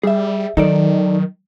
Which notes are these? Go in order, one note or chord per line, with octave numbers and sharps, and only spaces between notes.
G3 G#4 E5
D#3 F#3 D#4 A4 D5